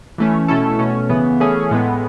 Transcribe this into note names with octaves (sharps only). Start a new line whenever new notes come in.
E3 A3 C#4
B2 A3 C#4 E4 A4
B2 A3 C#4
C#3 E3 B3
E3 A3 C#4 G#4
A2 G#3 B3